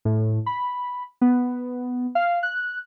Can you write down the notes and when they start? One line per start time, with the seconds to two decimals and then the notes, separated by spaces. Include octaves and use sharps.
0.05 A2
0.46 B5
1.21 B3
2.15 F5
2.43 F#6